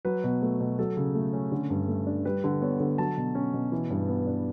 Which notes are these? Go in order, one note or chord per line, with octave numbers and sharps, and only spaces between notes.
F#3 B4
B2
A3 B4
B2
F#3 A4
C#3
A3
C#4
D3
G2
A3
D4
G3 B4
D3
B3 C#5
D3
F#3 A5
B2
C#4
B2
E3
G2
B3
D4